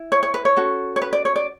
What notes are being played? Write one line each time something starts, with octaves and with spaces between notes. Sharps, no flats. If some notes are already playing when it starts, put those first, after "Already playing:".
Already playing: E4
C#5
C#5
B4
C#5
C#4 F#4 A4
C#5
B4
D5
C#5
D5